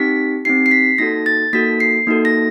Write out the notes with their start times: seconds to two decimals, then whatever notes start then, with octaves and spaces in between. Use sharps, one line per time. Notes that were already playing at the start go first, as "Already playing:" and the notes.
Already playing: C4 D#4 G4 B6
0.45 C4 D#4 G4 C7
0.66 C7
0.71 B6
0.98 A#3 D#4 F#4 A4 A#6
1.26 A6
1.53 A#3 D#4 F#4 A4 B6
1.80 C7
2.07 A#3 D#4 F#4 A4
2.25 A#6